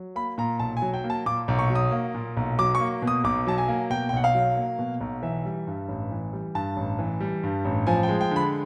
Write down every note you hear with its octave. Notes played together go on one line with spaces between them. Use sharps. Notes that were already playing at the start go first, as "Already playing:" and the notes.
Already playing: F#3
A#3 B5
A#2 A#5
B1 A5
G#5
F#3
G5
A#3
A5
A#2 D6
B1
C#6
F#3
D#6
A#3
A#2
B1
F#3 D6
C#6
A#3
B2
D#6
B1 D6
F#3 A5
G#5
A#3
B2 G5
G5
B1 F#5
F5
F#3
A#3
B2
B1
E3 E5
G3
G2
A1
E3
G3
G2 A5
A1
E3
G3
G2
A1
F3 G#5
G5
G#3
G5
D3 B5